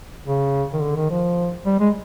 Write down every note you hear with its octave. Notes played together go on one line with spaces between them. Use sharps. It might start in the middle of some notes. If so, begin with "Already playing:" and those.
C#3
D#3
D3
D#3
F3
G3
G#3